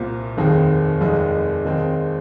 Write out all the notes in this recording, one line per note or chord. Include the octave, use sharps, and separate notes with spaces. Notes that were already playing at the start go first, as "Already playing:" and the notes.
Already playing: C2 A#2 A#3 F4 C5
F1 D#2 D#3 C4 G#4
F1 D#2 D#3 G#3
D#2 D#3 G#3 C4